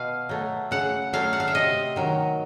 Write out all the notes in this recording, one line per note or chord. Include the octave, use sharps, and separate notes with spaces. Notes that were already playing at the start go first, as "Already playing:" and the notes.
Already playing: B2 F5
F#3 A3
C#3 F#5
F#3 A3 F5
F#5
F5
E5
C3 D#5
D#3 F#3